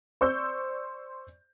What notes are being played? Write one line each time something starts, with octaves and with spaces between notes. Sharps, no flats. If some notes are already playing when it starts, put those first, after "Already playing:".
C5 D5 C#6 E6 G6